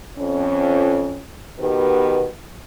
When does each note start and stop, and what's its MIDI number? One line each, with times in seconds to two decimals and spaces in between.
0.19 1.20 41
0.19 1.20 61
1.60 2.27 47
1.60 2.27 51
1.60 2.27 59
1.60 2.27 67
1.60 2.27 71